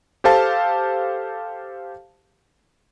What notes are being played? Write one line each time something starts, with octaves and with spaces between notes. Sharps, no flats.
G4 A4 C5 F5 A5